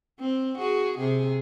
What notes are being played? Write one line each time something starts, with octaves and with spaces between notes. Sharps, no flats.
C4
F#4 G#4
C3 G#4